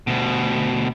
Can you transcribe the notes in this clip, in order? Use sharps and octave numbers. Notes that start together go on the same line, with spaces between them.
D2 B2